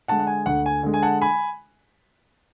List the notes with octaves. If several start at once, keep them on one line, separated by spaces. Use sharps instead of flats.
D3 G#3 F#5 A5
F#5
G#5
D2 F#5
G#5
D3 G#3
G#5
F#5 A5
G#5 B5